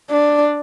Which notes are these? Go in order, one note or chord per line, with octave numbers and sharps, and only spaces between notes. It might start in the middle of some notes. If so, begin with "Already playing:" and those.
D4